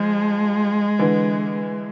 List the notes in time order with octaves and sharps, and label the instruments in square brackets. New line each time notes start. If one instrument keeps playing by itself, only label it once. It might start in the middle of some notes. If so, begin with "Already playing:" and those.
Already playing: [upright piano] F3 [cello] G#3
[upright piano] D3 E3